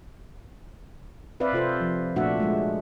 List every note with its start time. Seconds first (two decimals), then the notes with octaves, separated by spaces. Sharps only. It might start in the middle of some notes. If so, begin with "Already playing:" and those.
1.40 C4 B4 D5 E5 F5
1.53 C3 F4 A4 C5
1.81 F3
2.16 A#2 A3 D4 F#4 E5 F#5
2.40 G#3 A3